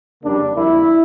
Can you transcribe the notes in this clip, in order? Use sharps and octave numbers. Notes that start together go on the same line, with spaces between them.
F2 C#3 G3 A#3 D4
F2 D3 G3 A#3 E4